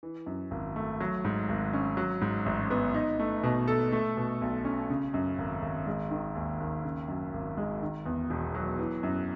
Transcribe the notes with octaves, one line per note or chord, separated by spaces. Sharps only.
E3
F#2
G#1
A3
F#3
G#2
G#1
C#4
F#3
G#2
A1
B3
D#4
A3
B2
A4
A3
B2
B1
C#4
C#3
F#2
G#1
G#1
G#3
D#3
D#2
D#2
C#3
F#2
G#1
G#3
D#3
E2
E1
F#3
E3
F#2